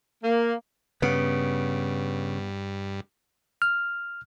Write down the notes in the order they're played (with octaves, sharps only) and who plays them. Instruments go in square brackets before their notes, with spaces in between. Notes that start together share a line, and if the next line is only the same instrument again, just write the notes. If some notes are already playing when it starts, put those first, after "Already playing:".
[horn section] A#3
[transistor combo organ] G2 [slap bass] C#3 [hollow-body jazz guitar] B3
[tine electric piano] F6